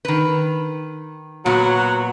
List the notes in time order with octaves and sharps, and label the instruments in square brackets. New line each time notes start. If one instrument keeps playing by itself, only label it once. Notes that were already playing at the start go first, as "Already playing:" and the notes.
[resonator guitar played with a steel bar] D#3 B4
[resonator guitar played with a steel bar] A#2 B3 C#5 [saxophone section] F#3 F#4